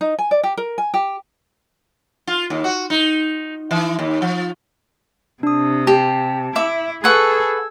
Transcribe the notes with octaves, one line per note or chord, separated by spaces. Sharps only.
D#4
G#5
D5
G4
A#4
G#5
G4
F4
D#2
F#4
D#4
E3
D#2
F3
C3 D4 D#6
G4 A5
E4 E5 D6
G#4 A4 B4 F#5 C#6 E6 G#6